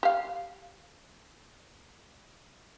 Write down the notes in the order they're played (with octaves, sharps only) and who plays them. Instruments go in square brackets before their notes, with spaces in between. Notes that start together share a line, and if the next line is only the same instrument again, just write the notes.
[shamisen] G4 F5